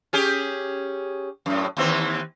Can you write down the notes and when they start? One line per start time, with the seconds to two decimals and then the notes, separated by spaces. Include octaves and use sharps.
0.13 C#4 G4 G#4
1.46 F#2 A2
1.77 D#2 E3 C4